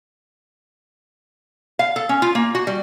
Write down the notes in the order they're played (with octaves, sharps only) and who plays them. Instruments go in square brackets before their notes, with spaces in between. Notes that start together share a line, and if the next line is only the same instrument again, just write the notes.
[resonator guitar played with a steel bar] F5
A4
C#4
F4
A#3
F#4
G3